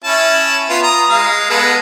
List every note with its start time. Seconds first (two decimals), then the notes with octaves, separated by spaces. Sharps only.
0.04 C#4 E4 A5
0.69 B3 F4
0.83 A#5 D#6
1.10 G#3 F5
1.50 G#3 B3 A4